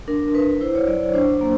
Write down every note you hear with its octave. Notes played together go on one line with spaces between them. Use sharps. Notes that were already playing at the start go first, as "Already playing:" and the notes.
D4 A#4
D4 B4
E4 C5
C#5
F#3 D5
D4 C5
A#3